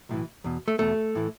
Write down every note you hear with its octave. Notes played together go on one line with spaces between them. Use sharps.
B1 A2 E3
E2 B2
A3
E2 B2 A3
A2 E3